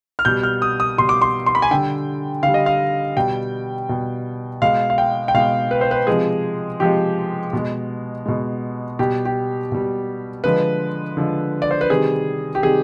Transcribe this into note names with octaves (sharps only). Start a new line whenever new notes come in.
F6
B2 G3 G6
F6
D#6
D#6
B2 G3 C6
D6
C6
C6
B5
G#5
D3 G3 G5
D3 F5
G3
D#5
F5
B2 G3 G5
B2 G3
B2 G#3 F5
F5
G5
G5
B2 G#3 F5
B4
C5
B4
C3 F3 G#3 G#4
C3 F3 G#3 G4
B2 G#3
B2 G#3
B2 G3 G4
G4
B2 G3
D3 F3 G#3 B4
D3 F3 G#3
D5
C5
B4
C3 D#3 G3 G#4
G4
C3 D#3 G3 G#4